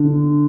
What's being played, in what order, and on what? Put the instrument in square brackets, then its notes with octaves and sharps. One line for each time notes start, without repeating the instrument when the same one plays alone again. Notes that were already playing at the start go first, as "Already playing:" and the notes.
Already playing: [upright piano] D3